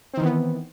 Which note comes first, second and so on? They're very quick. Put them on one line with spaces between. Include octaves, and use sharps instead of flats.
C4 D#3 E3 B3